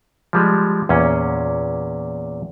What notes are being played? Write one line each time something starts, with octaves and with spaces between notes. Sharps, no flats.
F3 G3 G#3
E2 A#2 C#4